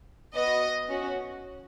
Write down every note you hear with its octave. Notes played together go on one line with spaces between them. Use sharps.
B3 F#4 D#5
C#4 F#4